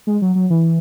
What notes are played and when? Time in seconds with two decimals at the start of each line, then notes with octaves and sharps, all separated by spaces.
0.07 G#3
0.22 F#3
0.35 F#3
0.50 E3